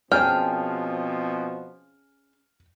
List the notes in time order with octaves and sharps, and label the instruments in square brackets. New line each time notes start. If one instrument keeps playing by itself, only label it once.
[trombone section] B2 F3 C4 [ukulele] C#4 G#4 A5 [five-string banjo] G5 [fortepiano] F6